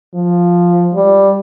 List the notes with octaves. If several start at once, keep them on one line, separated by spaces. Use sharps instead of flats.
F3
G3